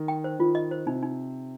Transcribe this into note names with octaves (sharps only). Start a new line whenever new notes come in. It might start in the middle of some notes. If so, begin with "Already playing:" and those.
Already playing: D#3
G5
C5
D#3 F4
D#5
C5
C3 D#4
D#4